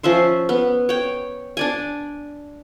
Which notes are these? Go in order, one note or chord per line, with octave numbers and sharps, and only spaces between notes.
F3 C#4 E5 C6
B3
C#5 G5
D4 D5 G#5